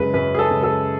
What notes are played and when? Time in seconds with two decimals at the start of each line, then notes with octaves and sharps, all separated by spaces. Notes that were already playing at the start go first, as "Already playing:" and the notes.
Already playing: F#2 C#3 G#3 B4
0.14 F#2 B4
0.35 G#4
0.39 A4
0.51 C#3 G#3
0.63 A4